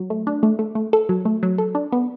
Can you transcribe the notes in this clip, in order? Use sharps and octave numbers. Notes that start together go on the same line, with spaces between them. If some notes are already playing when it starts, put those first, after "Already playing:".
Already playing: F#3
A3
D4
A3
A3
A3
A4
F#3
A3
F#3
A4
D4
B3